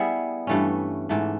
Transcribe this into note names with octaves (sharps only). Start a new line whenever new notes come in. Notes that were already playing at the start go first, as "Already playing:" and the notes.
Already playing: G3 B3 E4 G#4
G2 E3 A3 C#4
G#2 E3 A3